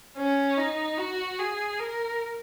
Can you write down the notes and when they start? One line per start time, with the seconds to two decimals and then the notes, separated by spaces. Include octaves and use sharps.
0.17 C#4
0.58 D#4
0.98 F#4
1.39 G#4
1.79 A#4